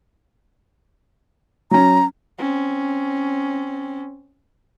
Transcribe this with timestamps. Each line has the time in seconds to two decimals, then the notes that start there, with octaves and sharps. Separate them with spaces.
1.71 F#3 C#4 A#5
2.38 C4 C#4